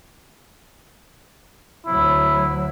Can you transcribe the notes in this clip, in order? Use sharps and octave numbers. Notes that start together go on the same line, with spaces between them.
D2 F#3 E4